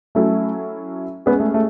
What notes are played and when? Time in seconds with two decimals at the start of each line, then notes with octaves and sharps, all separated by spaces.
0.15 F#3 A3 C#4 E4 A4
1.26 G#3 B3 C#4 G#4
1.40 A3
1.54 A3